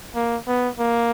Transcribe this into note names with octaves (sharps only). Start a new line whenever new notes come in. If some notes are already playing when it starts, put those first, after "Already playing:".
A#3
B3
A#3